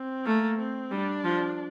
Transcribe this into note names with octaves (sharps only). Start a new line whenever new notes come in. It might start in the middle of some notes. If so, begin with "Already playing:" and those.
Already playing: C4
A3 A#3
C4
G3 D4
F3